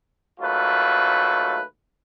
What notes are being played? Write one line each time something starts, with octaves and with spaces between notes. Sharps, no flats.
D#2 F#3 A3 F4 B4